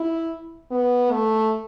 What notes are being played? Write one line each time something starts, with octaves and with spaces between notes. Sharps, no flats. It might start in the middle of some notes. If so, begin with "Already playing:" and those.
Already playing: E4
B3
A3